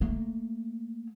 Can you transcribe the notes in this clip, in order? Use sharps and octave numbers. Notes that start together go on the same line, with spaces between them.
A3 A#3